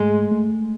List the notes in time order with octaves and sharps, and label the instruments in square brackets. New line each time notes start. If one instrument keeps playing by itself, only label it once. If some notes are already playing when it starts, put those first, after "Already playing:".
Already playing: [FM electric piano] G#2 A3 [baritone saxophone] G#3
[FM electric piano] A3